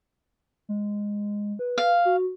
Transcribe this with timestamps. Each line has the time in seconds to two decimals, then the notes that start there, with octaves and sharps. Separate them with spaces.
0.69 G#3
1.59 B4
1.78 F5
2.05 F#4